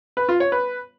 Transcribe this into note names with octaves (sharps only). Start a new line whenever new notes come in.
B4
F4
C#5
B4